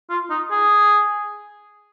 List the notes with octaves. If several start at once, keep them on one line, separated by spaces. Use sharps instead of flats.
F4
D#4
G#4